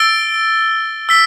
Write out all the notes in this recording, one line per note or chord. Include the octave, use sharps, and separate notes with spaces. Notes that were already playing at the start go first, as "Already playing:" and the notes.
Already playing: E6 A6 D7 G7
E6 B6 G7